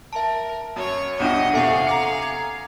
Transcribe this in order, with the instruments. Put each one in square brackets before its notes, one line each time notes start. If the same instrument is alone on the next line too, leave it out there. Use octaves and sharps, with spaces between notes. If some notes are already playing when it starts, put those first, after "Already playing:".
[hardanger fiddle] A#4 [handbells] E5 A5
[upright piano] F#2 [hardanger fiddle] C#5 C#6
[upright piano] C2 [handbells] B3 D4 F4 [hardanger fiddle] D#5 [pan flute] F#5
[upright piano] E2 C3 [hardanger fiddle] G#4 F5 [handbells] A4 E5 C#6
[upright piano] A#5 D6 C#7
[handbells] G#6